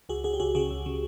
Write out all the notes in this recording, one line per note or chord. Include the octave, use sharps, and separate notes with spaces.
C#2 F#4 G#4
C#2 F#4 G#4
G4
C#2 F#4 G#4
C#3 F#4 G#4
C#2
C#3